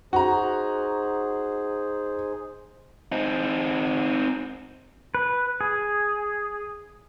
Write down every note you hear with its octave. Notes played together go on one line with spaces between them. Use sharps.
D#4 F#4 G#4 C5 A#5
C4 D#4
B4
G#4